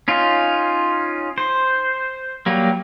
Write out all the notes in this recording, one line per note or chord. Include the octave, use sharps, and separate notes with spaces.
C#4 D#4 F4
C5
F#3 G3 A#3